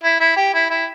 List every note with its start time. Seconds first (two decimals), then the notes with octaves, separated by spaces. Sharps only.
0.04 E4
0.20 E4
0.37 G4
0.54 E4
0.70 E4